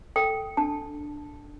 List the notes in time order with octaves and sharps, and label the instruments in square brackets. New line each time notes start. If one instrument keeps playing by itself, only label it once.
[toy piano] A4 G5
D4 A5